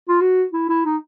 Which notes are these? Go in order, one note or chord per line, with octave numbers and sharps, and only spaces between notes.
F4
F#4
E4
E4
D#4